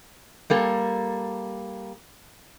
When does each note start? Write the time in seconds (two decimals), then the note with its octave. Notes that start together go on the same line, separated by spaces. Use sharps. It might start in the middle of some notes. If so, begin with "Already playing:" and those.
0.50 G3 A#3 A4